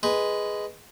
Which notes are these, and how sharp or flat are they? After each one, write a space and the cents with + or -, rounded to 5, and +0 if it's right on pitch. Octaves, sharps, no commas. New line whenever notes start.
G#3 +0 B4 +0